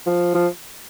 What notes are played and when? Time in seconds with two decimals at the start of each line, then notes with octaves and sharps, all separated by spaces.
0.06 F3
0.34 F3